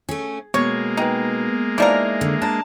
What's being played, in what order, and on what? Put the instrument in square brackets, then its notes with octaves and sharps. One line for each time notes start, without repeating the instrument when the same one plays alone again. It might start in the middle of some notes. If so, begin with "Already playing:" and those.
[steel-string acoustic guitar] A3 C#4 [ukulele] G#4
[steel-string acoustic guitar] B2 [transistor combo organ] G#3 A#3 [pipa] C#5
[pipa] D#4 [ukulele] B4 G5 G#5
[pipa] E3 F3 A#4 [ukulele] D#4 D5 F5 [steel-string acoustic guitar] C#5
[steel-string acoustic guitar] D3
[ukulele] D4 A#5 [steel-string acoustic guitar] A5